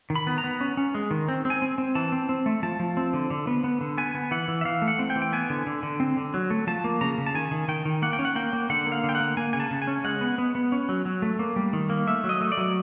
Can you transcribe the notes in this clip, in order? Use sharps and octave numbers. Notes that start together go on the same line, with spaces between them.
D#3
B5
B3
A#5
B3
C#4
C#4
G#3
D#3
C4
C4
G#5
C4
C4
E3 A5
C4
C4
A3
F3 A5
F3
C4
D3
D3
B3
B3
D3
B3 G#5
B3
E3 F#5
E3
E5
E3 F5
A3
F#5
C4
G5
E3
G5
B3 G#5
D3
D3
D3
C4
D3
F#3
A3
F3 A5
A#3
C#3 A#5
C#3
A5
D#3 G#5
D#3
D#3 G5
D#3
A#3 F#5
G5
C#4
F#5
A#3 G5
A#3
D3 F#5
A#3
F5
D3
G5
F#5
A#3
A#3 G#5
C#3 G#5
A5
C#3
G#5
C#4
G#3 F#5
B3
B3
B3
C#4
F#3
F#3
A3
A#3
G3
D#3
A#3
A3 E5
F#3
D#5
A3
D5
F#3